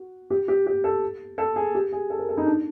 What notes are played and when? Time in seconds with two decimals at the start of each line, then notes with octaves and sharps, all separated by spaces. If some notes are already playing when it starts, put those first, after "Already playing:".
Already playing: F#4
0.30 G4
0.48 G4
0.66 G4
0.84 A4
1.38 A4
1.56 G#4
1.75 G4
1.92 G#4
2.10 A4
2.19 A#4
2.29 A4
2.37 D#4
2.46 D4